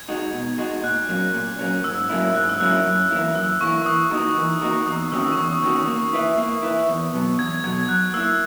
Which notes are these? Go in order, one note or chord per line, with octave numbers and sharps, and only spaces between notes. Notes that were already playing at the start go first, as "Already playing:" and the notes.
Already playing: G#6
G#3 D#4 F#4
B2
G#3 D#4 F#4
A#2 F#6
F#3 A#3 C#4
A#2
F#3 A#3 C#4
G#2 E6
F#3 A#3 C#4 E4
G#2 F#6
E6
F#3 A#3 C#4 E4 F#6
F#2
E3 A#3 E4
F#2 E6
E3 A#3 E4 C#6
E3 D#6
A#3 D#4 F#4 A#4
E3
A#3 D#4 F#4 A#4
E2 D#6
D#3 A#3 C#4 F#4 E6
C#6
E2 D#6
D#3 A#3 C#4 F#4
A#3
E4 B4 E5
A#3
E4 B4 E5
E2
B2 F#3 B3
E2 G#6
B2 F#3 B3 G#6
G#6
F#3 F#6
A#3 E4 E6